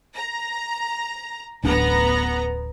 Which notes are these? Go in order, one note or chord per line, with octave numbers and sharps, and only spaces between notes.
A#5
D1 A1 B3 D4 A#5